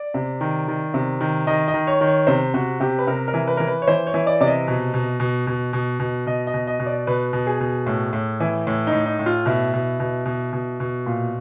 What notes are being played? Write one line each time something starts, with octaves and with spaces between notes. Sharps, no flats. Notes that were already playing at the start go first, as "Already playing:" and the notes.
Already playing: D5
C3
D#3
D#3
C3
D#3
D#3 D#5
D#5
D#3
C#5
D#3
C#5
C3 C5
C3 F#4
C3 G4
B4
C3 A#4
A#4
E3
B4
E3 A#4
B4
C#5
E3 C5
C#5
E3
D5
C3 D5
D#5
B2
B2
B2
B2
B2
B2
B2 D#5
D#5
B2
D#5
B2
D5
B2 B4
B2
G#4
B2
A2
A2
E3
A2
D#4
A2
D#4
A2
F4
B2 E4
B2
B2
B2
B2
B2
A#2